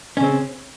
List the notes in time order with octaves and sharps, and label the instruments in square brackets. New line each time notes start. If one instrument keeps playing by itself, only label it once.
[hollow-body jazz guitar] C#4
C#3
C4